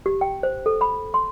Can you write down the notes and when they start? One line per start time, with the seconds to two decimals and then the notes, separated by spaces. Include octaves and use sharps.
0.06 G4
0.21 G5
0.43 C5
0.66 A4
0.81 B5
1.14 C6